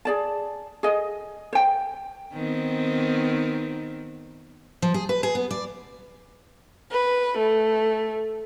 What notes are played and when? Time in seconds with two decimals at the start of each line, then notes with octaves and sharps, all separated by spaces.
0.05 G#4 D5 A5
0.83 G#4 D#5
1.53 C5 G5
2.34 D#3 B3 C4
4.82 F3
4.94 G#4
5.09 B4
5.23 G#4
5.35 B3
5.51 D5
6.92 B4
7.39 A3